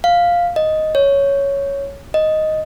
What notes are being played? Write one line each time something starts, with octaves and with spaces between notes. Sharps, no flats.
F5
D#5
C#5
D#5